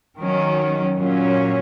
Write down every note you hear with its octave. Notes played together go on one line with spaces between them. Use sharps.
D#3 F#3 C#4
A#2 F#3 C#4